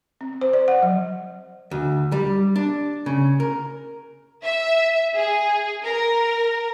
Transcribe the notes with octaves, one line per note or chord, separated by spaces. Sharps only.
C4
C5
D5
F#5
F#3
D2
G3
D4
C#3
A#4
E5
G#4
A#4